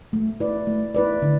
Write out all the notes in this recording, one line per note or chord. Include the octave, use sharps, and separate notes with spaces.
A3
E4 B4 D5
A3
E4 B4 D5
D3